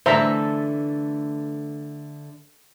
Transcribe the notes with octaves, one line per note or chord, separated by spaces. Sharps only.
D3 E3 A3 A4 C5 E5 A#5